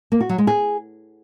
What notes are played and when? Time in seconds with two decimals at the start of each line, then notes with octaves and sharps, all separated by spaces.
0.12 A#3
0.21 F#4
0.29 F#3
0.38 G#3
0.47 G#4